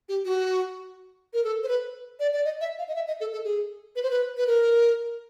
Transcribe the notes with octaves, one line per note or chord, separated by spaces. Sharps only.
G4
F#4
A#4
A4
C5
B4
D5
D5
D#5
E5
F5
D#5
E5
D#5
A4
A4
G#4
B4
C5
B4
B4
A#4